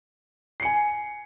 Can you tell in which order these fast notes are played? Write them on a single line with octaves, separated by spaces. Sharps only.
C7 C#7 G#5